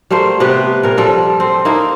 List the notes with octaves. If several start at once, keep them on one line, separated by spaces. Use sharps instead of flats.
G3 A3 A#3 C5
C3 B3 G4 B4
A#2 A#4
F3 G3 A4
C4
A#3 D#4 E4